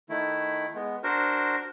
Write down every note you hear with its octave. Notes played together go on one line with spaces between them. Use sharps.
D#3 A3 E4
G#3 B3
D4 F#4 A#4 C5